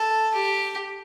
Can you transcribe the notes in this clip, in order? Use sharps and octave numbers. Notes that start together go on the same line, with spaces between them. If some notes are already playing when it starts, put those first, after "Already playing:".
Already playing: A4
G4